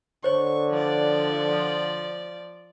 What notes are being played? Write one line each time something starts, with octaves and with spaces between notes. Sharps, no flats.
D3 C5 C#5 C#6
F3 D5